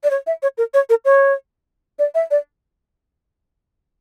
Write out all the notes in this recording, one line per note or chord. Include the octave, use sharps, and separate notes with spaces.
D5
C#5
E5
C#5
A#4
C#5
A#4
C#5
D5
E5
D5